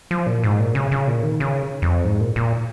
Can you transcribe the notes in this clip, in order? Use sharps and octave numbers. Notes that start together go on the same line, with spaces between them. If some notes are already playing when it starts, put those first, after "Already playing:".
F3
A#2
G#2
A#2
C#3
C#3
A#2
D#3
C#3
F2
G#2
A#2
A#2